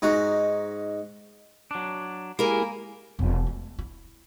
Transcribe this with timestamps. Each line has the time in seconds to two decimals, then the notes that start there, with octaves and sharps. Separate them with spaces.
0.02 G#2 D#4 F#4
1.71 F#3 D4
2.39 G#3 A#3 E4 G4 G#4 A#4 G#5
3.19 E1
3.46 A3
3.79 E4